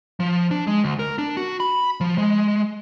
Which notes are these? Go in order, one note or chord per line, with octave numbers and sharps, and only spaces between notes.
F3
D4
G#3
D2
A#4
D4
F#4
B5
F3
G#3